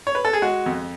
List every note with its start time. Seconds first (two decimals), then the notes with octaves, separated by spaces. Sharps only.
0.07 C#5
0.15 B4
0.25 A4
0.33 G#4
0.42 G#3 F#4
0.66 F2